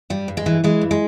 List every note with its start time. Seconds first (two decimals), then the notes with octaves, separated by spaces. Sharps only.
0.10 G2 G3
0.28 G2
0.37 G#3
0.46 E3
0.64 E3 G#3
0.81 G2
0.91 G#3